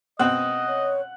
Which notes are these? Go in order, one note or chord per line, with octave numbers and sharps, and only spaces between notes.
B2 C4 D#5 F#5
C#5